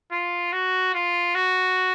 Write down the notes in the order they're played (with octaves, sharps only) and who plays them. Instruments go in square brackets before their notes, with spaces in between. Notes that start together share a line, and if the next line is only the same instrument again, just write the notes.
[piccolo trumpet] F4
F#4
F4
F#4